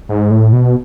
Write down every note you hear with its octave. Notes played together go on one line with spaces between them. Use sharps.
G#2
A2
B2